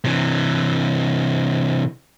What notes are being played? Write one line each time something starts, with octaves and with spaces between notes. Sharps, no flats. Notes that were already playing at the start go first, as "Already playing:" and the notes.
C3 E3